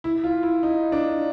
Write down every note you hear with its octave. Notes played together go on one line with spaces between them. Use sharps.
E4
F4
E4
D#4
D4